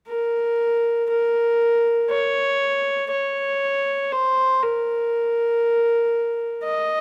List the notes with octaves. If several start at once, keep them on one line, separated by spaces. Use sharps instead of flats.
A#4
A#4
C#5
C#5
C5
A#4
D#5